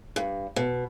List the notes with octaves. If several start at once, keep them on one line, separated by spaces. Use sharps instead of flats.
G2
B2